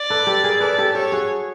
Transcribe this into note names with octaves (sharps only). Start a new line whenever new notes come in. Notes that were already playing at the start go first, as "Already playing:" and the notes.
Already playing: D5
A4 B4
G4 A4
G#4 A#4
A4 B4 D5
G4 A4
G4 A4 C#5
F#4 G#4